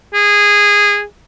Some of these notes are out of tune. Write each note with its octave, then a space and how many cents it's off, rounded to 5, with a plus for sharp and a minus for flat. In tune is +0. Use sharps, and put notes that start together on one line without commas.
G#4 -15